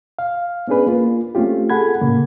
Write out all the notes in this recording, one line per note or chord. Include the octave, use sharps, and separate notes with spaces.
F5
B3 C#4 D4 G#4 B4
A#3 F4
A3 C4 C#4 F4 G4
G#4 A4 F#5 B5 G#6
A2 C#3 A#3